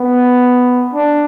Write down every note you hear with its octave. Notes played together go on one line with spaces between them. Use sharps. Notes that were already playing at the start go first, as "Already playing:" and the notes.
Already playing: B3
D4